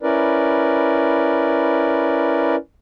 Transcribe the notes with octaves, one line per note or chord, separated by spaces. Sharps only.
C#4 E4 A#4 B4 D5